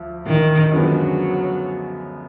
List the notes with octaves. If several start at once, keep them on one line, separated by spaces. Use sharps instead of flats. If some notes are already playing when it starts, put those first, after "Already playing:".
Already playing: D2 F3
D#3
F#2 D3 F3 F#3 G#3 B3